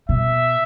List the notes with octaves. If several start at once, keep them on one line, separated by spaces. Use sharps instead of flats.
B2 E5